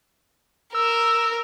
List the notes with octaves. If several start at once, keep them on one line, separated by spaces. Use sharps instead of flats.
A#4 E6